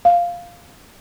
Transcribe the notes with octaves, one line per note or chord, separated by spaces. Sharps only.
F5